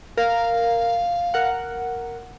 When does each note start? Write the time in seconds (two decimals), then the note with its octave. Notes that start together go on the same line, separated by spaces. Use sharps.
0.17 A#4 F5
1.34 A#4 F#5